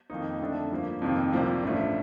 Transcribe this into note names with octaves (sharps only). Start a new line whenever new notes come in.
F2 D#3 A#3 D#4
F2 D3 A3 D4
G2 F3 A#3
F2 C3 D#3 A#3
C2 C3 F3 A#3
A1 G2 F3 A3